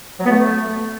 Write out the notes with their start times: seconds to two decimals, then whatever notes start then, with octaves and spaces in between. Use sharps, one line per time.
0.20 F#3
0.25 B3
0.30 A3